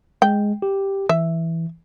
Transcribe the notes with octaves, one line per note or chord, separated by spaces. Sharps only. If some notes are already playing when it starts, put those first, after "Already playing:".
G#3 G5
G4
E3 E5